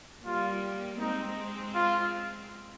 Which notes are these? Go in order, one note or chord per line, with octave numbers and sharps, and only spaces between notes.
G3 A#3 F4
G#3 C4 D#4
F4